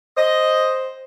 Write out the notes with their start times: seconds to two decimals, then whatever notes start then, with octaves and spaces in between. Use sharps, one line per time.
0.17 C5 D#5